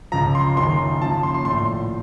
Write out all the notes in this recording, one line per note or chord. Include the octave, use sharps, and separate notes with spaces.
C#2 C#3 F3 A#5
C6
F#1 F#2 D#3 C6
D#2 C#3 F3 A5
C6
C6
A#1 A2 F3 C6